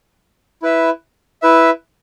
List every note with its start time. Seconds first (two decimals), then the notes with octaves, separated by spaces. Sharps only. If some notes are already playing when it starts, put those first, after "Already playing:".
0.62 E4 B4 E5
1.42 E4 B4 E5